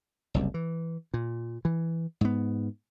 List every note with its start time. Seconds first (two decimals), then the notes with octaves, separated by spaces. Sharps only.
0.34 F#1 C2
0.54 E3
1.14 A#2
1.65 E3
2.21 G#2 B3